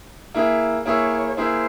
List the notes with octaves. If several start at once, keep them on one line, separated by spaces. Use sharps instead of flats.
A#3 E4 G#4 E5
A#3 E4 G#4 C#5 E5
A#3 E4 G#4 C5 E5